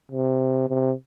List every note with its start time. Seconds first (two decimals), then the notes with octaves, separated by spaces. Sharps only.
0.11 C3
0.68 C3